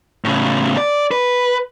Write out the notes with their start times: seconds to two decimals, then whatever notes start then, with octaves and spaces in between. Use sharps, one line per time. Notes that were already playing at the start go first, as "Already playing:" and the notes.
0.24 A2 C#3
0.77 D5
1.11 B4